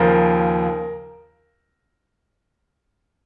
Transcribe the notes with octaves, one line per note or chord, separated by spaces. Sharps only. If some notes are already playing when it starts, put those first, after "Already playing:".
Already playing: D#2 C#3 F3 A#4